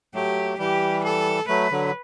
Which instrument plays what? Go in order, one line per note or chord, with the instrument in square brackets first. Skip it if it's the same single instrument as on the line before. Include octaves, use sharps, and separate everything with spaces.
[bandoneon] F#3 A3 [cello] G4
[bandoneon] E3 G3 [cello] G4
[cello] A4
[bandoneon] F#3 A3 [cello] B4
[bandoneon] D3 F#3